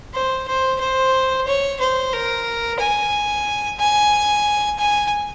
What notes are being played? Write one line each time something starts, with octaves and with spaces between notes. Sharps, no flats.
C5
C5
C5
C#5
C5
A#4
G#5
G#5
G#5